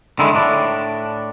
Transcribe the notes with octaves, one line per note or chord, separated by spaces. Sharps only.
D3 D#3 G#3 E4
A2 D4